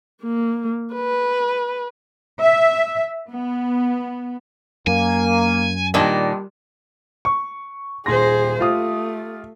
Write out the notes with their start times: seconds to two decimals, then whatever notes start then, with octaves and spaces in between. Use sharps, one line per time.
0.23 A#3
0.94 B4
2.40 E5
3.29 B3
4.87 F#2 A#3 G#5
5.94 A#2 D#3 G3 D4
7.25 C#6
8.06 D#1 G#4 C5 C6 A#6
8.60 A3 F4 G4 D#6